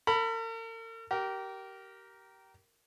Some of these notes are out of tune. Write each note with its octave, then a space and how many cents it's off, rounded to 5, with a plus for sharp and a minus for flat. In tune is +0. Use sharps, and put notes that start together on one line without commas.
A#4 -45 B5 +0
G4 -25 A#4 +0